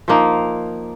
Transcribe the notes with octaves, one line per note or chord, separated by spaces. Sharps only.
F3 A#3 D#4